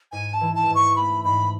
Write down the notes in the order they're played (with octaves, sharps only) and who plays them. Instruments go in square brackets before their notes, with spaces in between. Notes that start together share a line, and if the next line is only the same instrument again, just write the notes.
[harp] G#2 [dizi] G#5
[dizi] A5
[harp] E3
[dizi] A5
[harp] G#2
[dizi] C#6
[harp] A3 [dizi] B5
[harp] G#2 [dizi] B5